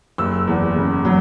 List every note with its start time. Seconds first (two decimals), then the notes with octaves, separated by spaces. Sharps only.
0.18 F#1 E6
0.47 E2
0.76 C#3
1.05 F#3